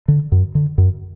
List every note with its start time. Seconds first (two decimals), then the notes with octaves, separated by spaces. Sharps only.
0.08 D3
0.32 F#2
0.55 D3
0.78 F#2